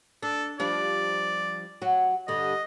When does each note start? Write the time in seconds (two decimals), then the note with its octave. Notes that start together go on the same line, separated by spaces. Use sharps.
0.23 D4 A4
0.60 F3 G3 D4 D5
1.82 F#3 F#4
2.28 G2 D3 D#5